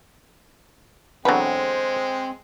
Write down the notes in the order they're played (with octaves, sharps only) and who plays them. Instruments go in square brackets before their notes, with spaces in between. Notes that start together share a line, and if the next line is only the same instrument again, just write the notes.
[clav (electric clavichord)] E2 B2 F#3 [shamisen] D3 B4 [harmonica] G#3 [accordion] C4